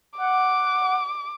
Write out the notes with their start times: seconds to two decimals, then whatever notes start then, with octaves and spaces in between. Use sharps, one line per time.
0.18 F#5 D6